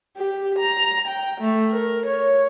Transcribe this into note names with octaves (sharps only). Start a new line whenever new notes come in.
G4
A#5
G5
A3
A#4
C#5